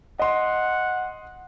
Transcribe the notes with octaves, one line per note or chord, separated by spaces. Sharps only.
D#5 F#5 C6